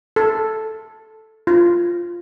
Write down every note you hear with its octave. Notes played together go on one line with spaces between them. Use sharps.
A4
F4